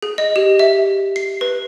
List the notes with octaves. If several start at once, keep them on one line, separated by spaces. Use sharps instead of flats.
G#4
D#5
G4
E5
C7
B4